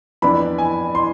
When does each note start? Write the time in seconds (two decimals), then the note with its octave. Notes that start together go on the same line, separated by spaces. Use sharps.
0.22 F2 E3 B3 D4 B5
0.58 G#5
0.95 C6